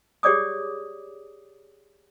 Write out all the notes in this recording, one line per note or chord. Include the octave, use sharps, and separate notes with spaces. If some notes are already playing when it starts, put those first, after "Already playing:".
G4 G#4 C#5 D5 D6 D#6